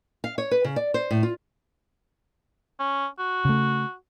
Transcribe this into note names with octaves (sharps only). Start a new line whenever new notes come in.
F5
C#5
B4
C#3
D5
C5
A2
F4
C#4
F#4
C#3 A3